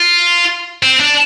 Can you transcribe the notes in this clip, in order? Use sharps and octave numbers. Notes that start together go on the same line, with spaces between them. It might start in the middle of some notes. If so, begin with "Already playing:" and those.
Already playing: F4
C4
D4